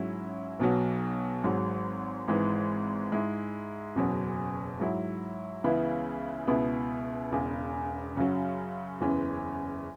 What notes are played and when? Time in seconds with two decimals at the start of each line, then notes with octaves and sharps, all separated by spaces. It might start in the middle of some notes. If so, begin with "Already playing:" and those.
Already playing: G#2 F#3 C#4 E4
0.60 B1 B2 F#3
1.44 G#1 G#2 F#3
2.28 G#1 G#2 E3 G#3
3.12 G#2 G#3 E4
3.95 F#1 E2 B2 F#3 C#4
4.80 G#2 F#3 E4
5.64 C#2 C#3 E3 B3 E4
6.47 C#2 B2 B3 E4
7.31 E1 E2 C#3
8.16 F#2 C#3 F#3
9.00 F#1 E2 E3 C#4